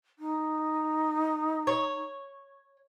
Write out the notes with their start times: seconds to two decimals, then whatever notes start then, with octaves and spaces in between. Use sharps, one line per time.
0.19 D#4
1.67 C#5